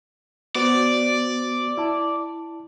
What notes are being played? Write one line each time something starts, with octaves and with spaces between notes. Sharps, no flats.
B3 F#4 C5 D5
E4 A5